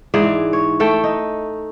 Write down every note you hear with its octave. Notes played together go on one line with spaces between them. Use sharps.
G#2 E3 G#4 D5
C#5
A3 A4 G5
D#4